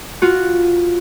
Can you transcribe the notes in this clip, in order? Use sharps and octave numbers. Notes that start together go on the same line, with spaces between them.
F4 F#4